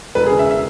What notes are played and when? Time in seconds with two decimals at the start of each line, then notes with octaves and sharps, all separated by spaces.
0.15 E1 B4
0.26 G#4
0.31 C#3
0.39 E5
0.51 E5